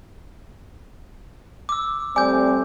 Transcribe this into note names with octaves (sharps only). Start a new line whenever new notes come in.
D6 E6
G3 A3 C4 D5 G#5 D6 G6